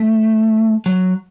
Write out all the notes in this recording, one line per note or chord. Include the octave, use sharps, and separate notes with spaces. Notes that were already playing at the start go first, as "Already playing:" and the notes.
Already playing: A3
F#3